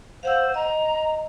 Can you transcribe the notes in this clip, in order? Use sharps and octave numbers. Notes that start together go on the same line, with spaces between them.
C5 F5 F#5 E6
D#5 A#5